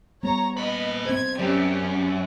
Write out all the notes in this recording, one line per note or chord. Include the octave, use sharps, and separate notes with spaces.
G3 B3 C#5 A#5
A#2 B4 D#5 B5
C4 C5 G#6
F#2 C#4 G4 D5